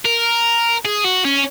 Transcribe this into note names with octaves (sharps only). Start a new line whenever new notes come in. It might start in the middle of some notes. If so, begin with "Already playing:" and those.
A#4
G#4
F#4
C#4